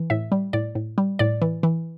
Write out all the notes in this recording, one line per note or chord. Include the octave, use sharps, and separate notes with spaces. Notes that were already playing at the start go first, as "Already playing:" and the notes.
Already playing: E3
A2 E5
G3
A2 D5
A2
G3
A2 D5
E3
E3